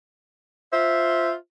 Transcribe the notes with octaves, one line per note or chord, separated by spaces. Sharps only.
F4 C5 E5